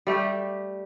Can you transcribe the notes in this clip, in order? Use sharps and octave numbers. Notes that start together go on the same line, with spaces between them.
G3 A3 G4